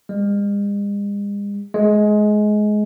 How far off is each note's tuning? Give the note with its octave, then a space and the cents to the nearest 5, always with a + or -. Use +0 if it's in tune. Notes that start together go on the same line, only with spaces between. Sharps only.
G#3 -45
G#3 +20